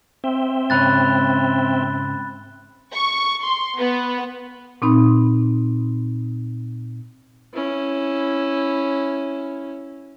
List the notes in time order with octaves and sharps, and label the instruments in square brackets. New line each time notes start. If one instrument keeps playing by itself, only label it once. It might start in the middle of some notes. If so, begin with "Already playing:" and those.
[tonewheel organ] C4 E5 G5
[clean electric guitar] G#2 C#3 C#4 [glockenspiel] B5 F#6 A6
[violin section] C#6
C6
B3
[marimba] A#2 C4 D#4 B5
[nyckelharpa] C#4 E4